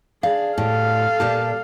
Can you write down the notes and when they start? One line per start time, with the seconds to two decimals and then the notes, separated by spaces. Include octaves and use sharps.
0.23 D4 G#4 F5
0.58 A2 G3 A4 F5 A5
1.20 A#2 G3 G4 A5